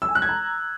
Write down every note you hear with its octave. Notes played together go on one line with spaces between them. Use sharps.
E6
G#5
F#6
G#6
A#5